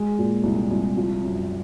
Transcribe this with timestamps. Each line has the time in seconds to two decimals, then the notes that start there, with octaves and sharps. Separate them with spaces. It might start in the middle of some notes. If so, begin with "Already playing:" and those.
Already playing: G#3
0.18 A#2
0.44 C2
0.71 C2
0.97 F3
1.23 F#2